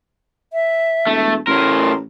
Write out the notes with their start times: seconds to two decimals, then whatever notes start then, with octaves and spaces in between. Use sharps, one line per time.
0.53 E5
1.07 E1 A3
1.47 A1 A2 A#4 C6